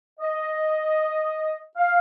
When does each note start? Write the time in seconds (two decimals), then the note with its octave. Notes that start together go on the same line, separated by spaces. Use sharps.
0.20 D#5
1.77 F5